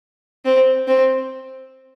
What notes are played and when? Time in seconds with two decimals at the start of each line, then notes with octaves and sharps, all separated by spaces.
0.45 C4
0.88 C4